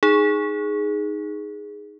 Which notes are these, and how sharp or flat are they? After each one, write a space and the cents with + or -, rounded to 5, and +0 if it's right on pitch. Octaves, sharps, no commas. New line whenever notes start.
D#4 +0 G#4 +0